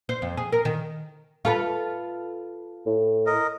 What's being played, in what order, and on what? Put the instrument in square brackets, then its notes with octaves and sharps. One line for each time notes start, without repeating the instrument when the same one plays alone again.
[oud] C5
F2
G#4
A#4
D#3
F4 A4 B4
[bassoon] A2
[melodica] A#4 D#5